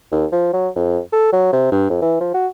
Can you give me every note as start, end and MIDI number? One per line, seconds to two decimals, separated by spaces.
0.11 0.26 39
0.32 0.50 53
0.53 0.69 54
0.76 1.00 41
1.13 1.32 69
1.32 1.52 54
1.52 1.68 48
1.72 1.86 43
1.90 1.97 41
2.01 2.16 52
2.20 2.31 53
2.34 2.47 66